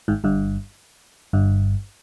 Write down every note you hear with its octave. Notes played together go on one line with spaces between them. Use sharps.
G#1 G#2
G1 G2
G1 G2